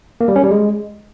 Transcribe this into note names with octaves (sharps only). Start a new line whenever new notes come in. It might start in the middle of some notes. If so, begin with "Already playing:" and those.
A#3
G3
C#4
G3
G#3